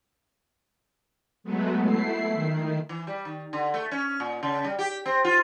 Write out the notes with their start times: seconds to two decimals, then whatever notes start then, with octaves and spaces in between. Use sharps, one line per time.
1.44 F#3 G#3 A3 B3
1.83 A3 E4 C7
2.34 D#3
2.89 E3
3.07 G3
3.25 D#3
3.53 D3
3.74 A3
3.91 C#4
4.20 A#2
4.43 C#3
4.64 G3
4.79 G4
5.06 C4
5.25 F4